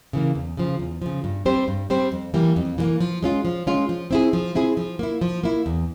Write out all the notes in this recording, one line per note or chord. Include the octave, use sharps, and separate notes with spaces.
C#3 E3 A#3
E2
C#3 F3
E2
C#3 F3
G2
G3 C4 G4 C5
G2
G3 C4 G4 C5
F2
E3 G3 A#3
F2
E3 G3 A#3
F3
G#3 C#4 F4
F3
G#3 C#4 F4
F3
C4 E4 G#4
F3
C4 E4 G#4
F3
A#3 E4
F3
A#3 E4
E2